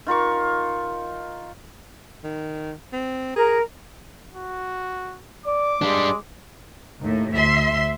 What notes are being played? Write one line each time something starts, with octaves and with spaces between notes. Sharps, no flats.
D#3 F4 A#4 C#6
D#3
C4
G#4 A#4 A#5
F#4
D5 D6
G3 G#3 D4
D#2 A2
D2 E5 C6